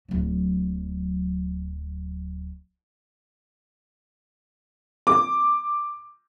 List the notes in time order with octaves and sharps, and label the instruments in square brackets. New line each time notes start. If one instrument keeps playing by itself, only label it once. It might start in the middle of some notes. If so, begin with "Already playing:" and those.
[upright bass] D1 F#3
[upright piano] D6